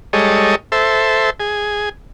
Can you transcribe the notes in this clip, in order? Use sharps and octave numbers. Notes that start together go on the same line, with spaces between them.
G3 G#3 A4 C#5 D#5
A4 C5 E5
G#4